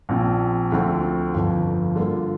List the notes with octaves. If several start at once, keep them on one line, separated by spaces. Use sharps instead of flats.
A#1 A#2 F3 C4
D2 D3 F3 C4
G1 F2 F3
G2 D3 A#3 F4